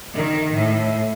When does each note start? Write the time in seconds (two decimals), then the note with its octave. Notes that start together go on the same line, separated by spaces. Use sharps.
0.13 D#3
0.54 A2